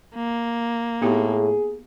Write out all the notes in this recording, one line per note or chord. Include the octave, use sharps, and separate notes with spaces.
A#3
A2 B3 D#4 G4 G#4